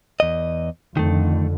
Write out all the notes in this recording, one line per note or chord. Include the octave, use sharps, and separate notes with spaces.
E2 D#5
F2 D3 D#3 A3